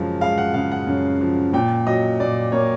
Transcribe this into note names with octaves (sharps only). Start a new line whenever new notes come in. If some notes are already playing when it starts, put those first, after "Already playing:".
Already playing: F#2 C#3 F3 G#3
G#3 F5
F#5
C#3 F5
F#5
F#2
F3
A#2 G5
F#3 D#5
A#2 D5
A#3 C#5